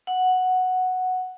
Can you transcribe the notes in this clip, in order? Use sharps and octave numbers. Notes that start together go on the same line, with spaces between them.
F#5